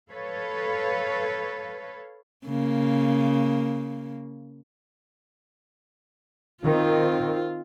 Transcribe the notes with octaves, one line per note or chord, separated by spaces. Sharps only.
A4 B4 C#5 F5
C#3 A#3
D#3 C4 F4